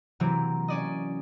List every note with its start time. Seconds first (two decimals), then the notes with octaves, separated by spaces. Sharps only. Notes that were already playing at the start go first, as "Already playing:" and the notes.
0.20 C3 E3 F#3 A#3 C4
0.68 C#4 D5 D#5